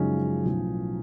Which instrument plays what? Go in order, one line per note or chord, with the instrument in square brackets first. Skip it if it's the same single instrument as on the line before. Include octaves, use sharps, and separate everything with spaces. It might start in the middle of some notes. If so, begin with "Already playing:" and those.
Already playing: [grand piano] F#2 C#3 F3 G#3 [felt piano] C#4 D#4
[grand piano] B1 A2 F3